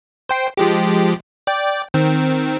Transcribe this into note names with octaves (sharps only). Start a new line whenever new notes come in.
C5 G5 C6
F3 G#3 G4
D5 G5
D#3 C4